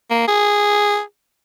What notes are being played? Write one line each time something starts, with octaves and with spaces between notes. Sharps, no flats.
A#3
G#4